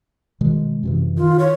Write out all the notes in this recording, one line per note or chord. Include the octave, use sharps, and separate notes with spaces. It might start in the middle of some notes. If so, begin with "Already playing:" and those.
B2 D#3 G#3
F#2 C3 E3
D#3 F4
C#5